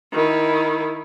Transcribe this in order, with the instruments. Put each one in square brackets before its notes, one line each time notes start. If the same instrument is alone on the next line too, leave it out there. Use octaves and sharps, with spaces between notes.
[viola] D#3 E4